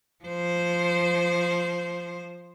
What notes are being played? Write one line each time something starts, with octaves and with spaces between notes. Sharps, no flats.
F3 C5